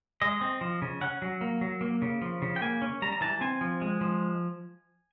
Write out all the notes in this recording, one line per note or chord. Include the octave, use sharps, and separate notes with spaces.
G#3 D#5
C4
F3
C#3
C#4 F#5
F#3
A#3
F#3
A#3
C#3
F3
C#3
G5
A#3 G#5
C#4
G3 A#5
A#5
E3 A5
C4 G#5
F3
G#3
F3